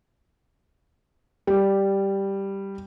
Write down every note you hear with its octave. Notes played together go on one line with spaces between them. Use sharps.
G3